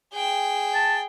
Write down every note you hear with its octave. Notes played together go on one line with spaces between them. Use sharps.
G#4 G5
A5